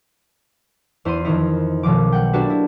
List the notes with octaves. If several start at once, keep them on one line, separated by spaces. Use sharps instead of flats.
E2 E4 C5 C6 D#7
F2 D#3 E3 D#4 E4
B1 B2 D#3 F3 D6
F#5 G5
A#3 D4 F#4 G4 A4 B4
E4